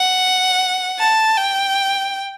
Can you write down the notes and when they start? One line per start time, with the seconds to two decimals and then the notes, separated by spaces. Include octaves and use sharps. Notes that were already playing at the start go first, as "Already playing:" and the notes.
Already playing: F#5
0.98 A5
1.37 G5